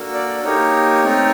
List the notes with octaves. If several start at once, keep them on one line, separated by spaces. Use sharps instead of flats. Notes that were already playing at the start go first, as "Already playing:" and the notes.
Already playing: A#3 D4 F#4 A4
D5
A#3 D#4 G4 C#5
A3 C4 D#4